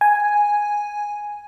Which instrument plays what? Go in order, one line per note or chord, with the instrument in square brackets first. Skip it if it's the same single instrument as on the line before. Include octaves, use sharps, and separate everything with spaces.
[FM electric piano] G#5